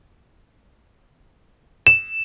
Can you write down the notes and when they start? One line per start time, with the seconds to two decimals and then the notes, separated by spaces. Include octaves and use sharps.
1.87 E7